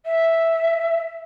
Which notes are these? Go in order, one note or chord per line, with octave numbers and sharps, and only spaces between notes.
E5